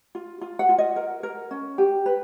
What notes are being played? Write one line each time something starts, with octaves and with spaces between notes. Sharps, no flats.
F4
F4
F#5
F4
D#5
A#4
A#4
C#4
G4
B4